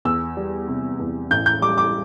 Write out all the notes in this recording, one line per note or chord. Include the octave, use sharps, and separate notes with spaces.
E2 E6
G3
C3
E2
A1 G6
G6
G3 D6
D6